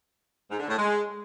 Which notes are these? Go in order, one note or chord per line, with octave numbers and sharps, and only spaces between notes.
G#2
D3
A2
G#3